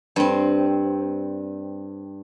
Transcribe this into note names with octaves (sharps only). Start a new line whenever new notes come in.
G2 C4